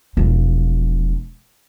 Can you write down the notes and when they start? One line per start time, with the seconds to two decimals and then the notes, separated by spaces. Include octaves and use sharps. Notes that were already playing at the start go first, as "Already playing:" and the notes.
0.17 E1 F3